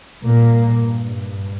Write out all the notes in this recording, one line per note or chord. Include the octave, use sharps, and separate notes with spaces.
G2 A#2 A#3